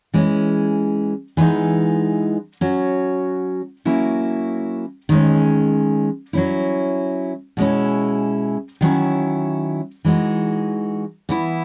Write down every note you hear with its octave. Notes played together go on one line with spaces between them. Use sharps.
E3 G#3 C#4
E3 G#3 B3 D#4
F#3 C#4 F#4
F#3 A#3 C#4 E4
D#3 G#3 C#4
F#3 C#4 E4
B2 G#3 C#4 E4
D#3 F#3 C#4 E4
E3 G#3 D#4 F#4
E3 B3 E4